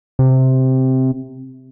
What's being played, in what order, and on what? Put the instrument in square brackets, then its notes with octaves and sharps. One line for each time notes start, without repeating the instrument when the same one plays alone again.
[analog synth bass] C3